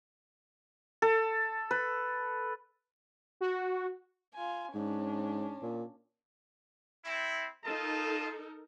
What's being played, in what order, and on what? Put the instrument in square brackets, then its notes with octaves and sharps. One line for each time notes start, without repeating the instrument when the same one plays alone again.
[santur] A4
B4
[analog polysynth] F#4
[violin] F4 G#5
[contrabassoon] G#2 [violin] C#4 D4
[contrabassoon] A#2
[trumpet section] C4 E4
[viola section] D#4 A4 A#4 [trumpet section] F4 D#5 A5